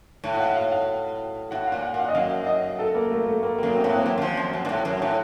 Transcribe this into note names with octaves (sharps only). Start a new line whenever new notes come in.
A2
F#5
F5
F5
F5
A2 F#5
A#2 F5
F#5
A#2
F5
D#5
F#2 F5
D#5
A4
A#3
A3
A3
A#3
F#2 A#3
C4
A2
C4
A#3
F#2 C4
F#2
F3
F#2
F#2
A#2
A2
F#2
A2